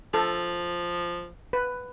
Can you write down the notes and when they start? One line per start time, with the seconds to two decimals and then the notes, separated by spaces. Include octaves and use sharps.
0.14 F3 A4
1.53 B4